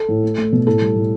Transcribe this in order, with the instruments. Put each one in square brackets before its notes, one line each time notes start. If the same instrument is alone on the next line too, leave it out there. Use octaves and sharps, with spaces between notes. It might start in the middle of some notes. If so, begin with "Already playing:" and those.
Already playing: [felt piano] A4
A2
A3
A3
B2
A2 A4
G3
A2